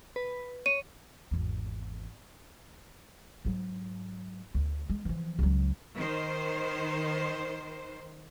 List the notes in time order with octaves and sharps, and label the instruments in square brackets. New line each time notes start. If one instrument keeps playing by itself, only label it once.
[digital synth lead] B4
[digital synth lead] C#5 [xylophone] D#7
[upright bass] G#1 E2
G#2 F#3
D2
G#3
E3 F3
C#2 F#3
[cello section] D#3 C5